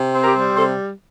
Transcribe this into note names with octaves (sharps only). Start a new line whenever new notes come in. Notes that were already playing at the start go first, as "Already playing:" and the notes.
Already playing: C3
C4
G4 A#4
G3
C3 A4 C5